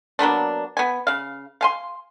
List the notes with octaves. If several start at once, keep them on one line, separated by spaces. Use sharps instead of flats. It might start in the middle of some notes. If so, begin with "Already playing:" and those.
F#3 A#3 B3 D4
B3 G#5
C#3 F5
F5 G#5 C6